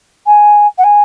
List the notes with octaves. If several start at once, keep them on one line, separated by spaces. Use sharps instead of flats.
G#5
F#5
G#5